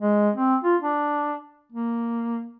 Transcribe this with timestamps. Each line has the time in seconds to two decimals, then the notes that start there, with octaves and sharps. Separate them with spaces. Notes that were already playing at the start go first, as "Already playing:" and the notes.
0.01 G#3
0.35 C4
0.64 F4
0.82 D4
1.72 A#3